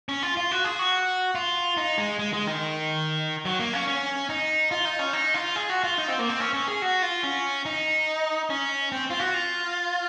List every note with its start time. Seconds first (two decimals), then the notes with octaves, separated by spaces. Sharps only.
0.09 C#4
0.23 F4
0.37 F4
0.51 F#4
0.65 G#4
0.79 F#4
1.35 F4
1.77 D#4
1.98 G#3
2.19 G#3
2.33 G#3
2.47 D#3
3.45 F#3
3.59 A#3
3.73 C#4
3.88 C#4
4.30 D#4
4.71 F4
4.85 D#4
4.99 C#4
5.13 D#4
5.34 F4
5.56 G#4
5.70 F#4
5.84 F4
5.98 D#4
6.08 C4
6.19 A#3
6.29 C4
6.40 C#4
6.54 C#4
6.68 G#4
6.82 F#4
7.02 F4
7.23 C#4
7.66 D#4
8.50 C#4
8.92 C4
9.10 F4
9.20 F#4
9.34 F4